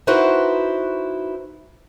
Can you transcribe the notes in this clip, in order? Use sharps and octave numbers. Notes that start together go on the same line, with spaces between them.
D#4 E4 F#4 B4 C5